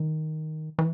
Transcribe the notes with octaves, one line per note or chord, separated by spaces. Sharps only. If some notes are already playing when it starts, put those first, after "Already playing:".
Already playing: D#3
E3